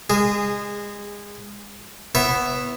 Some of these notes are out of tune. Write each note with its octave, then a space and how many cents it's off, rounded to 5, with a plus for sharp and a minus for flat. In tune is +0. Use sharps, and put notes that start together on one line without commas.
G#3 -25 G#4 -10
B3 +0 E4 +0 C#5 -40